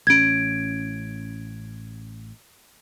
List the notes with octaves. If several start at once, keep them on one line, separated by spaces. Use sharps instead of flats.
A1 C#4 G#6 D7